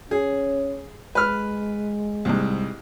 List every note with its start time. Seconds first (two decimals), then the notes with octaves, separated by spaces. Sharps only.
0.11 C#4 G#4
1.15 G#3 B4 F6
2.25 C2 G#2